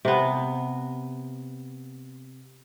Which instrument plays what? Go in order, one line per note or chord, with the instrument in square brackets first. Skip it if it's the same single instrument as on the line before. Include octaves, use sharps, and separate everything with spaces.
[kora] C3 B3